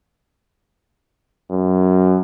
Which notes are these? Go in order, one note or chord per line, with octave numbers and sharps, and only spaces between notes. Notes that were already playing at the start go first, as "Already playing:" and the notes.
F#2